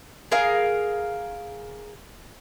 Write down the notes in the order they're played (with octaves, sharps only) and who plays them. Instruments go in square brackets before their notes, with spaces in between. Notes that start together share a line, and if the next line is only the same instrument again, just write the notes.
[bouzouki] G#4 A#4 F5